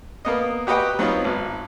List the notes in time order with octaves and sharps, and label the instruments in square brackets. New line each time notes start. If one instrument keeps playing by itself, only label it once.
[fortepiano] A#3 B3 D#5
F#4 G4 B4 D#5 F#5 G5
F#3 B3 C4 D#4 F4
G#1